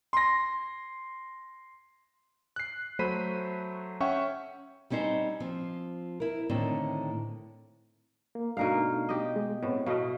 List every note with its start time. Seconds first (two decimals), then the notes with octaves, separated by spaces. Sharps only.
0.13 C6 A#6
2.56 F#6 C7
2.99 F#3 A3 C5 B5 B6 D#7
4.00 C#4 E5 F#5 G5 C#6
4.90 G3 C4 C#4 D#4 C5
5.40 F3 C4
6.20 E4 A#4
6.50 A2 D3 D#3 C4
8.35 A#3
8.57 B2 A3 D4 D#4 A#4 F5
9.09 G4 D#5
9.36 G#3
9.63 A2 B3 C4
9.86 B2 A3 D#5 F5